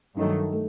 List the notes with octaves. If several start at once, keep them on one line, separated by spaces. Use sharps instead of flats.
G2 D#3 F#3 A3 D#4
A3